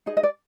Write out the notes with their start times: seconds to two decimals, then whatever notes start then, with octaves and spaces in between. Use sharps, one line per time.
0.06 D#4 G#4 D#5
0.17 D#5
0.23 D5